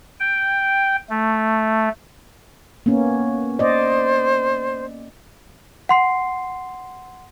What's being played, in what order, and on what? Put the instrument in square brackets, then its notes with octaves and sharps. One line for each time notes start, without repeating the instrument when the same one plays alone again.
[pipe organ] G5
A3
[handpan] A#3 B3 C#4
[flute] C5 [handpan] D5 D#5
[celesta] F#5 C6 C7